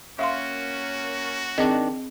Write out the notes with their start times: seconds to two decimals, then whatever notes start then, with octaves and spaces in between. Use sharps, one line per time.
0.19 A#3 C#4 F#4 E5 F5 C6
1.58 D#3 C4 D4 G#4 D#5